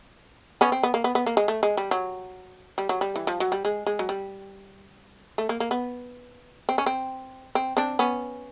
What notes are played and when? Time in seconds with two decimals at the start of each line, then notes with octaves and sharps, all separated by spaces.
0.61 B3 C#4
0.72 C4
0.83 B3
0.94 A#3
1.04 B3
1.15 B3
1.26 A#3
1.37 G#3
1.48 A3
1.63 G#3
1.77 G3
1.91 F#3
2.78 G3
2.89 F#3
3.01 G3
3.16 E3
3.27 F3
3.40 F#3
3.52 G3
3.65 G#3
3.86 G#3
3.99 F#3
4.09 G3
5.38 A3
5.49 A#3
5.60 A#3
5.71 B3
6.69 C4
6.78 C#4
6.86 C4
7.55 C4
7.77 C4 D4
7.99 B3 C#4